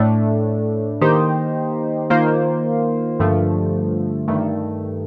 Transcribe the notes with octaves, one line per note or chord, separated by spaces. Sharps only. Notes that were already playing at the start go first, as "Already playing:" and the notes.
Already playing: A2 A3 D4
D#3 A#3 D#4 G4 C5
D#3 A#3 F4 C5
G2 D3 F3 A3
G2 D#3 A3